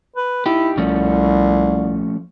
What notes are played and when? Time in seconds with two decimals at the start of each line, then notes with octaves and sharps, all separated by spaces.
0.16 B4
0.46 D#4 E4 G4
0.78 C2 F3 A3 C#4